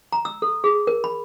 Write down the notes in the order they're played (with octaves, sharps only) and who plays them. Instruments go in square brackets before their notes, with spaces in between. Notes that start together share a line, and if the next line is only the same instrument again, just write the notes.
[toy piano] A#5
E6
A4
G#4
A#4
B5